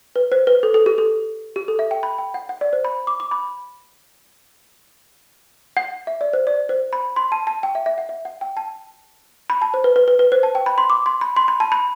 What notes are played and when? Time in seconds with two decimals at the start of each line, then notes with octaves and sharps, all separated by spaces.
0.16 B4
0.32 C5
0.47 B4
0.63 A4
0.74 A4
0.86 G4
0.98 A4
1.56 G4
1.68 A4
1.79 E5
1.91 G5
2.03 B5
2.18 G5
2.34 F#5
2.49 F#5
2.61 D5
2.73 C5
2.85 B5
3.07 D6
3.20 D6
3.31 B5
5.77 F#5
6.07 E5
6.21 D5
6.33 C5
6.47 D5
6.69 C5
6.93 B5
7.16 C6
7.32 A5
7.47 A5
7.63 G5
7.75 E5
7.86 E5
7.98 F#5
8.09 E5
8.25 F#5
8.41 G5
8.57 A5
9.50 B5
9.62 A5
9.74 C5
9.84 B4
9.96 B4
10.08 B4
10.19 B4
10.32 C5
10.43 A5
10.55 G5
10.66 B5
10.78 C6
10.90 D6
11.06 C6
11.21 B5
11.36 C6
11.48 B5
11.60 A5
11.72 B5